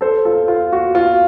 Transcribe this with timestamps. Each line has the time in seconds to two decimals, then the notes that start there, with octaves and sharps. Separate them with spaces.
0.01 A4 C5
0.25 F4 A4
0.48 F4
0.73 F#4
0.95 F4